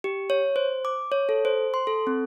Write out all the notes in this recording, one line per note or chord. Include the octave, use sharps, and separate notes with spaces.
G4
C#5
C5
D6
C#5
A4
C5
C6
A4
C4